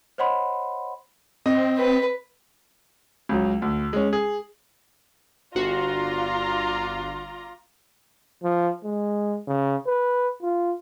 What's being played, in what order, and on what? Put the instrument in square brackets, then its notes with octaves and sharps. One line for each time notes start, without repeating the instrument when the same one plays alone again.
[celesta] C5 C#5 D#5 F#5 B5 C6
[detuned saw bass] C4 [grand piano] D#5
[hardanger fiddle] B4
[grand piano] C#2 F#3
D2
G#3 C#4
G#4
[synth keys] G1 F#4 C7 [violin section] F4 D5 A#5
[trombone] F3
G#3
C#3
B4
F4